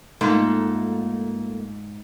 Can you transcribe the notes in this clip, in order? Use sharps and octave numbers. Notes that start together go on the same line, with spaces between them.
G#2 A3 A#3 F4